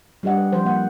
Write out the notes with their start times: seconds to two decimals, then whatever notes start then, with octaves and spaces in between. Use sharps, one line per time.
0.23 G3 D4 G4 D#5 F#5
0.38 B4
0.52 F3 C5
0.66 A#3 F#5